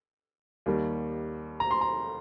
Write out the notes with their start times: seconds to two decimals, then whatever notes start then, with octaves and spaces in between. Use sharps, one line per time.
0.66 D#2 D#3 G3 A#3
1.60 A#5
1.71 C6
1.81 A#5